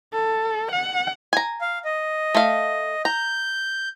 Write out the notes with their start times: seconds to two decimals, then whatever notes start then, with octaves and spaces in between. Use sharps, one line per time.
0.13 A4
0.72 F#5
1.33 G#5 A#5
1.61 F5
1.85 D#5
2.35 A3 F5
3.05 A#5 G6